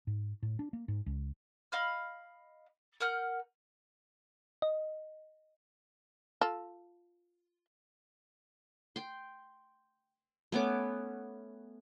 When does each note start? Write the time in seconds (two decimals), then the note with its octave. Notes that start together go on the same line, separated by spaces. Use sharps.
0.07 G#2
0.42 A2
0.59 D4
0.73 A#3
0.88 G#2
1.06 C#2
1.72 D#5 F5 B5 F6
3.00 A#4 F#5 F6 G6
4.62 D#5
6.41 F4 A4
8.96 G5 C6
10.52 A3 B3 C#4 D6